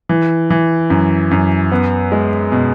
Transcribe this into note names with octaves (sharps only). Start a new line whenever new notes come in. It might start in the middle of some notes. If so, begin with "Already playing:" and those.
E3
E3
F#2
F#2
B3
G#3
B2